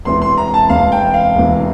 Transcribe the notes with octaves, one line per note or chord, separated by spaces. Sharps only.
E1 E2 C3 E3 C6
C6
A#5
A5
E1 E2 C3 E3 F5
G5
F5
E1 E2 C3 E3